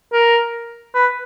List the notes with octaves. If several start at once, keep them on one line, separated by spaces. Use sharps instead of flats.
A#4
B4